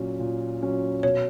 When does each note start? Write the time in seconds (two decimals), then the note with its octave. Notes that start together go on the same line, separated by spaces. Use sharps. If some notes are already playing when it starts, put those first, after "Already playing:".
Already playing: A#2 F#3 C#4
0.19 A#2
0.62 F#3 C#4
1.03 B2 C#5